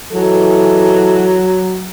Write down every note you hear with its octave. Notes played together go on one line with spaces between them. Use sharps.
E3 F#3 G#3 A4